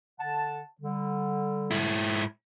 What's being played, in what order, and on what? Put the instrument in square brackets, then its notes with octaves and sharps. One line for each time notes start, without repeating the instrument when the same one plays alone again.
[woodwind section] D3 F#5 A5
D3 G3
[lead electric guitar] G#2 E4